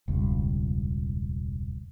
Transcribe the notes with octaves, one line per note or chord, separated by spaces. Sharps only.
E1 C#2 G2